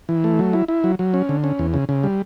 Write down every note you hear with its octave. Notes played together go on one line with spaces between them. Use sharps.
E3
A3
F#3
E4
E4
F#3
F#3
C#4
D3
C#4
E2
C#3
C#3
G3